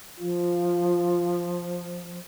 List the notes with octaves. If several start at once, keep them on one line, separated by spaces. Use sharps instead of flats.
F3 F4